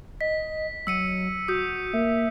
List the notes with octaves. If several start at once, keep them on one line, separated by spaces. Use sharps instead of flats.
D#5 B6
F#3 E6 C#7 D#7
F#4 D#6 G6
A#3 E5